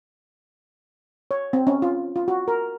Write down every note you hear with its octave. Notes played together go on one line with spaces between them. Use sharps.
C#5
C4
C#4
F4
F4
F#4
A#4